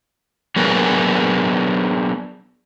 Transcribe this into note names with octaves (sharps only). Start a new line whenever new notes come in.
F#3 B3 D4 G#4 A#4 B4